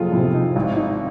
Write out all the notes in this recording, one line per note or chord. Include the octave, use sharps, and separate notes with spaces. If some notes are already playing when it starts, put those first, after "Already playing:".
Already playing: F#1 F2 C3 F4 G#4 A4
F2 C3 E4
D#4
G#1 E4
D#4